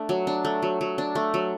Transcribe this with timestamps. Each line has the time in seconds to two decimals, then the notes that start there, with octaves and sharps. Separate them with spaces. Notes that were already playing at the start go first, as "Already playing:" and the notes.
Already playing: A3 D4
0.09 F#3
0.27 D4
0.45 A3
0.62 F#3
0.81 F#3
0.98 D4
1.15 A3
1.34 F#3